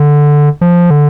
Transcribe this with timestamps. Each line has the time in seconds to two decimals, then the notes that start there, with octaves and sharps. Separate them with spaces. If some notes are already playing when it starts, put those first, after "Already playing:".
Already playing: D3
0.61 F3
0.90 D3